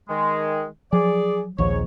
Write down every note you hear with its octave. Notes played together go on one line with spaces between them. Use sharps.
D#3 G#3
F3 F#3 G#4 D5
A#1 D#2 G#2 F3 C#5